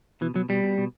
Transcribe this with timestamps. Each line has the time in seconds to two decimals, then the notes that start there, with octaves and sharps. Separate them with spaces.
0.21 B2 E3
0.34 B2 F#3
0.49 B2 G3
0.63 B2
0.78 B2